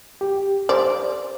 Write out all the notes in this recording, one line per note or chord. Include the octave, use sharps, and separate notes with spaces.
G4
C5 D5